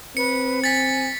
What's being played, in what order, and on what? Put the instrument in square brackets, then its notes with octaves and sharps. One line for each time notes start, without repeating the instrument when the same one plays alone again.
[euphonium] C4 [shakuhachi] B4 [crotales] C#7
[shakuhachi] G#5 [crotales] A6 B6